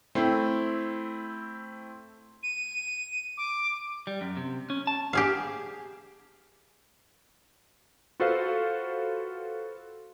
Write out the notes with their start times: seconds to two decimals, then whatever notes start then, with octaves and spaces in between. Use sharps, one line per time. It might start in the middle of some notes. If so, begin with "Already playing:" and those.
0.15 A3 C4 E4
2.43 D#7
3.37 D6
4.07 G3
4.21 F#2
4.37 C3
4.70 C#4
4.87 A5
5.13 G4 G#4 F5
8.20 F4 F#4 A4 B4 C5 F5